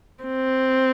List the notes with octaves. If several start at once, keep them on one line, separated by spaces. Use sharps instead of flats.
C4